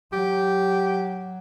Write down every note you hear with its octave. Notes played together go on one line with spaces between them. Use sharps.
F#3 G4